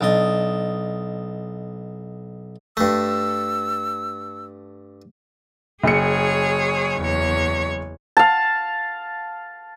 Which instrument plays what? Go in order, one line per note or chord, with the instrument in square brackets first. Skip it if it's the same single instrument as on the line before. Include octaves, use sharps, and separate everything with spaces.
[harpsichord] B1 D4 D#5
[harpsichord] G2 A3 [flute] E6
[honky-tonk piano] F#1 C#7 [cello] G#4 C#5
[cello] E2 C#5
[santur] F5 A5